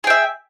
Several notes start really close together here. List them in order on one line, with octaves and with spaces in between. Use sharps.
G#4 G5 E5